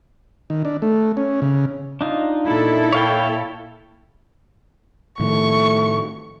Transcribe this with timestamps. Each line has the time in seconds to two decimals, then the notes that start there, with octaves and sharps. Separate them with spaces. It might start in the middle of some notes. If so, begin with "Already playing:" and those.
0.50 D#3
0.65 D4
0.82 A3
1.17 C#4
1.42 C#3
2.01 D4 D#4 F4
2.46 A#2 E4 A4
2.93 C#5 F5 G5
5.20 A2 D#3 F3 A3 C#6